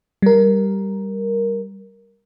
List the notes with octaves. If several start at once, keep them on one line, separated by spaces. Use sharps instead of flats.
G3 A#4